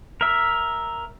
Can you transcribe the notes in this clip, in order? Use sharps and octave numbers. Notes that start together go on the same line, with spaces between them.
A#4 E5